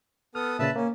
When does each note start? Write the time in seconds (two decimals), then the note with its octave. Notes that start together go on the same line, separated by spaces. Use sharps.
0.35 B3 A4 D#6 F6
0.59 A#2 C#3 B4 E5 A5 A6
0.76 A#3 C#4